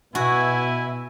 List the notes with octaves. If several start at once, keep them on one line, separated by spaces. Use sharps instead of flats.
B2 E4 F#4 E5 G#5